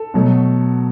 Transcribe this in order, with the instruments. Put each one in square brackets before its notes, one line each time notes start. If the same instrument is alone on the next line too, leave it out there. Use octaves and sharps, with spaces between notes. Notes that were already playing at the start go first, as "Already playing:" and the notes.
Already playing: [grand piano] A4
B2 F#3 A3